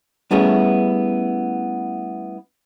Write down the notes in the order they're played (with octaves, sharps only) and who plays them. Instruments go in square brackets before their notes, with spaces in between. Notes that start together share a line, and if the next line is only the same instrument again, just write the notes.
[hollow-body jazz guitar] G3 A3 B3 C#4 E4 G#4